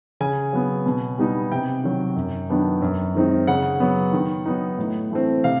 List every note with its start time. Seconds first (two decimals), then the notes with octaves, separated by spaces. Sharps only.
0.20 C#3 G#5
0.53 F#3 B3
0.86 B2
1.18 G3 B3 D#4
1.52 C3 G5
1.84 D#3 F#3
2.16 F#2
2.49 D#3 F#3 B3 D4
2.82 F#2
3.15 D#3 G#3 C4 D#4
3.47 C#3 F#5
3.80 F#3 B3
4.13 D#3
4.46 F#3 B3 D#4
4.78 A2
5.11 E3 A3 C4
5.44 C3 F5